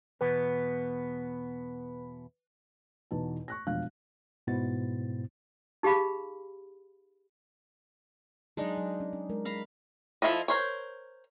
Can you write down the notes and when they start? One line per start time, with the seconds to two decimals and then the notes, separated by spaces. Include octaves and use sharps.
0.21 E2 B2 B3 B4
3.11 E2 B2 D#4 A5
3.48 C#6 F#6 A#6
3.67 E1 F2 D4 F5 F#6
4.47 G#2 B2 B3 E4 C5 A6
5.83 D#4 G4 G#4 F5 B5
8.57 F#3 G#3 D4 D#4 G#4
8.77 F#3
9.00 C#4
9.13 C#4
9.29 G#3 A#4
9.45 F5 A#5 B5
10.22 F3 E4 A4 D#5
10.48 A#4 C5 C#5